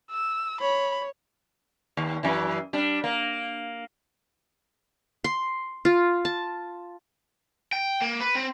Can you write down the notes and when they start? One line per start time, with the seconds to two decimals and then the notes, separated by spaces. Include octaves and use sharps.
0.11 E6
0.61 C#5 B5
1.97 D#2
2.23 F#2 E3
2.73 G3 D4
3.04 A#3
5.24 C6
5.85 F4
6.25 A5
7.73 G5
8.02 A#3
8.20 B4
8.35 C4